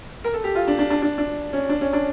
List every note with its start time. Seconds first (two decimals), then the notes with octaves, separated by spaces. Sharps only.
0.24 A#4
0.34 A4
0.44 G4
0.55 F4
0.68 D4
0.79 D4
0.90 D4
1.02 D4
1.18 D4
1.53 C#4
1.69 D4
1.81 C#4
1.93 D4